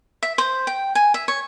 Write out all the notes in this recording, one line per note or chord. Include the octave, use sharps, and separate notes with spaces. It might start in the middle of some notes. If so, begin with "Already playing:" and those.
E5
C5
G5
G#5
E5
C#5